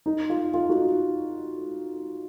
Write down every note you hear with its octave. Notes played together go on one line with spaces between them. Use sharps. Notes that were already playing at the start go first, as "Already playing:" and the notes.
D#4
F4
F4
D#4 F#4